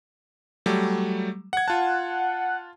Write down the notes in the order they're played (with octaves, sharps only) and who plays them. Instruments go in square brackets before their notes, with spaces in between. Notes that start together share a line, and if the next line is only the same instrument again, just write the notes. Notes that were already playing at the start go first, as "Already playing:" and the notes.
[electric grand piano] F#3 G3 A3
F#5 G#6
[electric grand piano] F4 A5 [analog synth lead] F#5